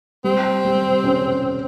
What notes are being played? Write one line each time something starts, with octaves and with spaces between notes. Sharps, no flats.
G3 C4
G3
C#4